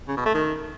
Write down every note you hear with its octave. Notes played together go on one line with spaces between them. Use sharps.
C#3
B2
A3
D#3